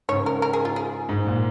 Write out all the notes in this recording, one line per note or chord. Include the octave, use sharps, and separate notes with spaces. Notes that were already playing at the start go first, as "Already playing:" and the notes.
G#2 C#3 C#5
A#4
A#4
G#4
F4
G#4
G#2
A#2